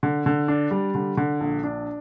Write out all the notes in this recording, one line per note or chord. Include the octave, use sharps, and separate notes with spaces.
D3
D3
D4
G3
D3
D3
A#1
D4